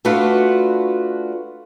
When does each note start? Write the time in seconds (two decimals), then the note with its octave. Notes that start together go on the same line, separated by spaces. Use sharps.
0.05 A3 D4 F4 F#4 B4